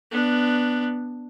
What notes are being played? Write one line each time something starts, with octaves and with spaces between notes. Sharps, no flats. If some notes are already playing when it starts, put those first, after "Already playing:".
B3 D4